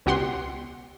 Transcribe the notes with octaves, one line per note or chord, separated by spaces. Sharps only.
C#2 B2 G4 F#5 C6